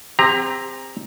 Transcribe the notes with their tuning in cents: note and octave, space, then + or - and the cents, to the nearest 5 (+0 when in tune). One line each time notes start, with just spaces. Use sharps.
C4 +0 G4 +40 A#5 +0